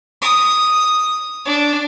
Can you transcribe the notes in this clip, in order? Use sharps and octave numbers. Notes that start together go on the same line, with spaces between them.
D#6
D4